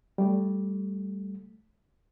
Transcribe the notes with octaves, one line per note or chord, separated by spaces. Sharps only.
G3 A3